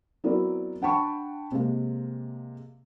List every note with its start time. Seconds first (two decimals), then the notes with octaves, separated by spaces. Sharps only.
0.24 F#3 B3 C4 E4 A#4 D5
0.82 D4 F#5 G5 A5 B5 C#6
1.52 C3 G#3 A#3